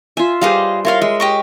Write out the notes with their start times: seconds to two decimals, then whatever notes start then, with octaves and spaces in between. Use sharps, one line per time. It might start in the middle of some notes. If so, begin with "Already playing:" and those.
0.17 F4 E5 G#5
0.41 G3 G#4 B4 C5 D#5 F5
0.85 E4 F4 A#4 C#5 F5 C6
1.02 G#3 E5
1.20 G4 D#5 C#6